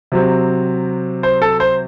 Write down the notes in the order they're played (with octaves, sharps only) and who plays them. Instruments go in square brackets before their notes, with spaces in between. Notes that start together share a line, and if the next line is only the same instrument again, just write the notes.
[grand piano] C3 F#3 C4
C5
A4
C5